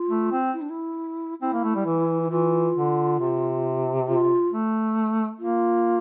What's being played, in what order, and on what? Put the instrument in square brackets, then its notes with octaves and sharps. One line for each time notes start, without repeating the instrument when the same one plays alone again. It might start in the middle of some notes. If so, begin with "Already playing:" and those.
Already playing: [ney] F4
[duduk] A3
C4
[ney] E4
D4
E4
[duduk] C4 [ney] E4
[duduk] A#3
A3
G3
E3
[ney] E4
[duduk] E3 [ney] F4
[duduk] D3
C3
[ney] F4
[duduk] A3
[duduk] A#3 [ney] F4